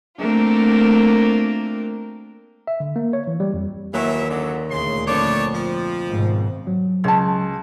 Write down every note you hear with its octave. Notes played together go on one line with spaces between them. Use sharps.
A3 A#3 C4 D4 F4 A#4
E5
D3
A#3
C#5
E3
G3
F2
D#2 E3 F#3 E5
F#2 D3 F#3
D2 A#2 C#3 C6
F2 A3 D4 C#5 D6
F3
G#1 G#2 B2
F#3
C#2 C#5 A5